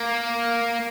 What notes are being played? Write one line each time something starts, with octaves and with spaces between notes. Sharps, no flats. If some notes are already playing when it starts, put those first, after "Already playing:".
Already playing: A#3